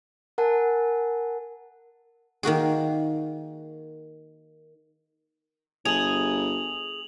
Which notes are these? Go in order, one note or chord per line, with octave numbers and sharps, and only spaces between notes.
A#4 F#5 G#5 A5
D#3 A#3 F#4 G#4
G1 G#4 F7 F#7